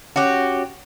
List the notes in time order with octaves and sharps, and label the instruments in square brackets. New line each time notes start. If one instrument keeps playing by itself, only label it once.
[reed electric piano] C#4 C#5 F#6 [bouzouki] F#4 G4